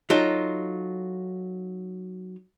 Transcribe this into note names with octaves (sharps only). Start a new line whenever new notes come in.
F#3 D#4 F4 A4